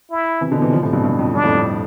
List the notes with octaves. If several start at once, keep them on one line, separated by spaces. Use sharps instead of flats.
E4
C3 E3
B2 D3
C3 E3
D3 F3
A2 C3
G2 B2
G2
F2
G2 D4
F2 A2
G2